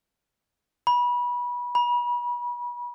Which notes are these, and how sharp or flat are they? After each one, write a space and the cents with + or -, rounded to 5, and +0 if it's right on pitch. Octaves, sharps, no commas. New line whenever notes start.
B5 -25
B5 -35